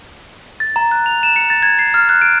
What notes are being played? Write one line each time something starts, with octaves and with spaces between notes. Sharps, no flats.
A6
A#5
F#6
F7
E7
C#7
A6
G#6
C7
F6
F#6
D7